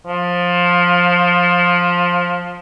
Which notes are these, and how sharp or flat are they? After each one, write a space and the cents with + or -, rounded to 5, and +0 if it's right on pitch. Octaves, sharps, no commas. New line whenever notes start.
F3 +15